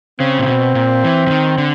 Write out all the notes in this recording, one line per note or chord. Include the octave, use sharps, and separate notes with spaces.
C#3 C4
A#2
B2
A#2
E3
E3
D#3
D3